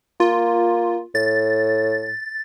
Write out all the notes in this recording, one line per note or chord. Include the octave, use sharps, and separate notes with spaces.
A#3 F4
A2 A6